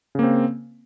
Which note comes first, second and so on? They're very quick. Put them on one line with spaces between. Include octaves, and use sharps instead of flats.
C#3 A#3 C4